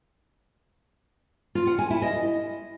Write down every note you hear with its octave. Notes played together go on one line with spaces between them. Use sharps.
F4
F#5
G#5
E4
D#5